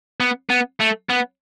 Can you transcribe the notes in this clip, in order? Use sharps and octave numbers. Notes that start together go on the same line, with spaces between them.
B3
B3
A3
B3